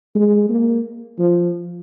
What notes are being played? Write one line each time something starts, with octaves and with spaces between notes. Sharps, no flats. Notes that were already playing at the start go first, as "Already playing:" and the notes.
G#3
A#3
F3